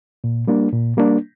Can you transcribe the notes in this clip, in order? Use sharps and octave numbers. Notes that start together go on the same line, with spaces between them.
A#2
G3 A#3 D4
A#2
G3 A#3 D4